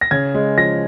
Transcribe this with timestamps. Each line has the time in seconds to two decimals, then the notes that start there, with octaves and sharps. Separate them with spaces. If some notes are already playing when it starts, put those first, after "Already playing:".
0.01 A#6
0.11 C#3 G#6
0.34 G#3
0.57 F3 A#6